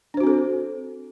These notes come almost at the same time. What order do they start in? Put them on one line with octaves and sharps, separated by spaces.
D4 C5 F#4 C4 A4